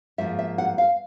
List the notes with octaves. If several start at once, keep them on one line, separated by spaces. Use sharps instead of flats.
G#2 F3 A#3 E5
E5
F#5
F5